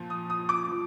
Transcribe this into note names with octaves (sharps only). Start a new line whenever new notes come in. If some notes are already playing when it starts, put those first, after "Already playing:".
Already playing: A#2 F3
D#6
D#6
D6
A#2 F3